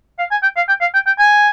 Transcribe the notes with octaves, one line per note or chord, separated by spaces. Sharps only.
F5
G#5
G5
F5
G5
F5
G5
G5
G#5